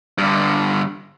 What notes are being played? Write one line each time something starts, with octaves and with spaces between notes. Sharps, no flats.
G2 D3